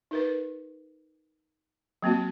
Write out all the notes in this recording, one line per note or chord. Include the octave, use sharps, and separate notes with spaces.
D#4 A#4 B4
F#3 A#3 C4 F#4